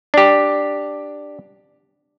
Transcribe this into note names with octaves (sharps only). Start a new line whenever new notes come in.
D4 G4